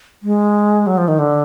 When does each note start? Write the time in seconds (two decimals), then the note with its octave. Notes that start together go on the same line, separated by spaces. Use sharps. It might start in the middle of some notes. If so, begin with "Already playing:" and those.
0.23 G#3
0.87 F#3
0.98 F3
1.08 D#3
1.19 D3